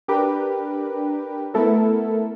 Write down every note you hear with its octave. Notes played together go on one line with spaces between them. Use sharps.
D4 G4 A#4 B4
A3 B3 E4 A4 A#4